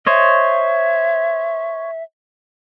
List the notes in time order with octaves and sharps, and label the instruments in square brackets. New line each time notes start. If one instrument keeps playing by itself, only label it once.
[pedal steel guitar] C5 C#5 D#5 [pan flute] E5